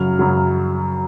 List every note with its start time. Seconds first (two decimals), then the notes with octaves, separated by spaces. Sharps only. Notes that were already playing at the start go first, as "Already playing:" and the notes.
Already playing: F#2 C#3 F#3 F6
0.19 F#2 C#3 F#3